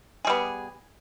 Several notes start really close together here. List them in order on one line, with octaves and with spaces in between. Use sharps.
G#4 G3 B3